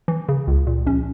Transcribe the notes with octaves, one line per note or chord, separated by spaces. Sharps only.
E3
C#3
C#2
A#2
A#1 C#4